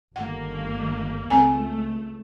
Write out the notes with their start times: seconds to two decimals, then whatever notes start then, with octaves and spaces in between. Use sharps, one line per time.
0.16 G1 D#3 A#3 F#5
1.30 C#2 A3 C4 A4 G#5